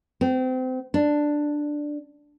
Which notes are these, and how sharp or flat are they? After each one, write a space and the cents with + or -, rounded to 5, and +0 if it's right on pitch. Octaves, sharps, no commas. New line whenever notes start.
C4 -30
D4 +5